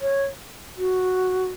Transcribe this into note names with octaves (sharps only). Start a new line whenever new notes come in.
C#5
F#4